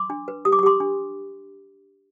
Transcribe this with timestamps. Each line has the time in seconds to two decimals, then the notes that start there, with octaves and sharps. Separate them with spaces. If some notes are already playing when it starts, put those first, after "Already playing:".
Already playing: C6 D6
0.10 D4
0.28 B4
0.45 G4 D#6
0.52 D6
0.59 C#6
0.63 G4 C6 D6
0.80 D4